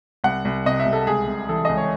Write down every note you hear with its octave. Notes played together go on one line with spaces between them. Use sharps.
C2 F#5
C2
C3 D#5
E5
C2
A4
C#2 G#4
C3
E3 A4
C#2 D#5
C#5